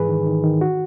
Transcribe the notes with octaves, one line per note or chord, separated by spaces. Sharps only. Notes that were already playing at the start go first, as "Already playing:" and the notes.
Already playing: G#2 E3 G#4 B4
D#3
D#3
D#3
F#4